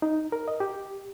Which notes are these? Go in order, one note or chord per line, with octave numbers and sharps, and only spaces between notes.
D#4
A#4
D#5
G4